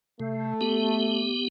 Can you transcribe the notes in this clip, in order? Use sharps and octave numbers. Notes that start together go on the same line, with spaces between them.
C3 A3
B3 G4